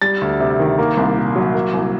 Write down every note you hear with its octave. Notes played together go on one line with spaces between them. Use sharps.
G3 A6
D2
C3
D#3
A#3
C2
A#2
F#3
A#3
C2